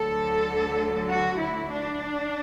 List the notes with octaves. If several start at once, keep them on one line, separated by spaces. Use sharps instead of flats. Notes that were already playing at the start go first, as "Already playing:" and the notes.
Already playing: D2 D3 F#3 A4
F#4
E4
D4